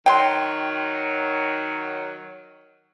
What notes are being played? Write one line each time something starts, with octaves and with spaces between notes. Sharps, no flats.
D#3 F#3 G5 C6